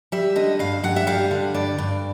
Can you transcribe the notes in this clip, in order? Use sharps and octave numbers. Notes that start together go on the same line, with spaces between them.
G3 E5
D3 D#5
G2 F5
G2 F#5
E5
G3 F5
D3
G2 D5
G2